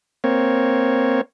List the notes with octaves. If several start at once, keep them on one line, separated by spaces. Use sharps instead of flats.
A#3 C4 C#5